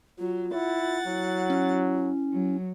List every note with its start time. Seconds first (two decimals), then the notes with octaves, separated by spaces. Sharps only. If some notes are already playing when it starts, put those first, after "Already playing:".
0.19 F#3 F4
0.53 E4 F#5 A6
1.07 F#3 E4
1.50 C#4
2.33 F#3